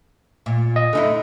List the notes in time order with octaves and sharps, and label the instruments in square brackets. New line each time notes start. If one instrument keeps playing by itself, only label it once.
[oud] A#2
[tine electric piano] D#5
[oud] D3 D#4 E4